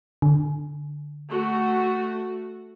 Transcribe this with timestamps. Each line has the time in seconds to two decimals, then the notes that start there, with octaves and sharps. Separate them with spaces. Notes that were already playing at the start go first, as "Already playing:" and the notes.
0.22 D3
1.29 A3 F#4